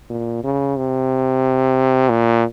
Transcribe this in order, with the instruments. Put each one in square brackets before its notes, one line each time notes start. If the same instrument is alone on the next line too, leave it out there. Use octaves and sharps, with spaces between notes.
[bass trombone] A#2
C#3
C3
A#2